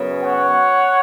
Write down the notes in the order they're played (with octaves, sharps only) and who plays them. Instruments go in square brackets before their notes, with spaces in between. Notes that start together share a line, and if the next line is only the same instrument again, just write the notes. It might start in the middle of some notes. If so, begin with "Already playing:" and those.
Already playing: [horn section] F#2 C#3 B3
C#5 F#5